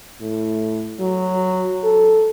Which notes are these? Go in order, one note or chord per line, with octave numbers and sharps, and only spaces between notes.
A2
F#3
A4